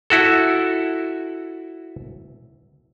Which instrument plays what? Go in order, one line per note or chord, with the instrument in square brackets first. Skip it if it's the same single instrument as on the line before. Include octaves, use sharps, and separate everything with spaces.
[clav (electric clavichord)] E4 F#4 A4